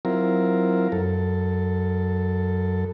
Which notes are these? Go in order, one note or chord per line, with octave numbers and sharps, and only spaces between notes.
F#3 C4 E4 F4 A#4
F#2 A4